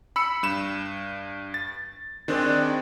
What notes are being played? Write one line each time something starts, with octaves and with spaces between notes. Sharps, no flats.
B5 E6 C#7
G2 E7
A6
D#3 G#3 C4 D4